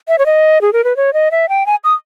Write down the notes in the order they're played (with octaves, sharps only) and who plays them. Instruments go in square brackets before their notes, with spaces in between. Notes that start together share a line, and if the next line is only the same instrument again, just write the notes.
[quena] E5
C#5
D#5
G#4
A#4
B4
C#5
D#5
E5
G5
G#5
D#6